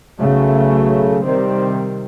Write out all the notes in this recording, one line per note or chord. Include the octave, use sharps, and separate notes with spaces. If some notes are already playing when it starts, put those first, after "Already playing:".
B1 C#3 F#3 A3
C3 D#3 G3 C4